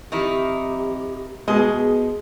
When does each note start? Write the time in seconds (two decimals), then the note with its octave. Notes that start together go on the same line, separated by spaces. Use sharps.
0.12 F2 D#3 D#4 E4 G4
1.48 B2 G#3 B3 G#4 D#5